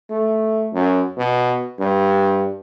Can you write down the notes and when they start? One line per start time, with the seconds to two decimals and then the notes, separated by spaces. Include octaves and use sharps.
0.10 A3
0.73 F#2
1.18 B2
1.79 G2